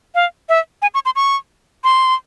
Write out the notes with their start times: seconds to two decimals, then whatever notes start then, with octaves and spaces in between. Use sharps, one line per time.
0.15 F5
0.49 E5
0.82 G#5
0.94 C#6
1.05 C6
1.16 C#6
1.84 C6